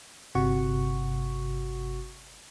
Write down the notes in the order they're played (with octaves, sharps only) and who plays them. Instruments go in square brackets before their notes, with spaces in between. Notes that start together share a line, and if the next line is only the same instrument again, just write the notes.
[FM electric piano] G1 C3 F#4 F#5 C#6